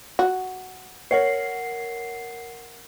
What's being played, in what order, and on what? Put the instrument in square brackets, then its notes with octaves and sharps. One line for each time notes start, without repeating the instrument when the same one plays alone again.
[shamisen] F#4
[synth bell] A#4 F#5 C7 [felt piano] C#5